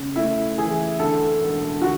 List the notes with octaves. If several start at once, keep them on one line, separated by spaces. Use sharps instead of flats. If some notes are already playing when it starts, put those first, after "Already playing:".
Already playing: C#3
A3 E4
E3 G#4
D2 A4
E1
D3 F#4